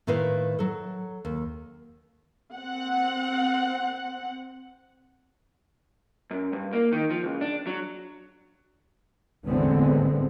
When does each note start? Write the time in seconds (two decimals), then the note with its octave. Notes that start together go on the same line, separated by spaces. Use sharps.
0.07 A2 D#3 E4 B4 C5 F5
0.59 F#3 A4
1.25 D#2
2.55 C4 F#5
6.31 F#2
6.53 G2
6.73 A#3
6.92 D#3
7.11 F3
7.24 C#2
7.41 D4
7.67 F#3
9.46 A1 E2 D3 G#3 B3 C4